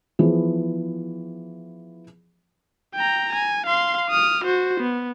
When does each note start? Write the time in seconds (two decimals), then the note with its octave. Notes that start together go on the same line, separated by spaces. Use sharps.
0.19 E3 F3 B3 G#4
2.95 G5 A#5
3.33 G#5
3.67 F5 C6
4.10 D#6 F6
4.45 F#4 C5
4.80 B3